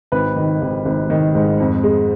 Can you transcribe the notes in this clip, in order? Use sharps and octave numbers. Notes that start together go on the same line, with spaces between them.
G#1 B4
D#3
G#1
G#1
D#3
G#2
F2
G#3